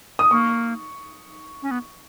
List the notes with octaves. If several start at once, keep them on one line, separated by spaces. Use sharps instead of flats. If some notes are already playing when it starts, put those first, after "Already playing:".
D#6
A#3 C#6
C#4
B3